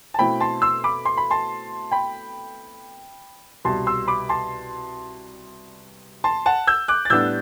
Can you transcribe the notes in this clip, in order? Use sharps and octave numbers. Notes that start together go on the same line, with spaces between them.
A5
B2 A3 C4 E4 G5 B5
A5 C6
C6 E6
B5 D6
C6
B5
A5 C6
G5 B5
C2 B2 G3 A5 C6
C6 E6
B5 D6
A5 C6
A5 C6
F#5 A5
E6 G6
D6 F#6
A6
A2 G3 B3 D4 E6 G6